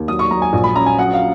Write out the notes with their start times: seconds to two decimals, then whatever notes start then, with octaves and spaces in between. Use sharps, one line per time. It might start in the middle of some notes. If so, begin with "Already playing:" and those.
Already playing: D#2
0.08 F#3 D#6
0.19 C#6
0.31 F#3 A#5
0.42 G#5
0.53 A#1
0.64 B5
0.76 C#4 A#5
0.86 G#5
0.98 F#3 F#5
1.14 F5